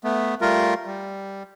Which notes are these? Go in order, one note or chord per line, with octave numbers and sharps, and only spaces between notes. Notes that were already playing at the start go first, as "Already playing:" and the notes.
A3 B3
G3 A3 F4 A#4
G3